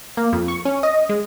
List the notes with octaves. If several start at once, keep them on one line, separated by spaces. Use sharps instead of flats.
A#3
F2
C#6
C#4
D#5
G#3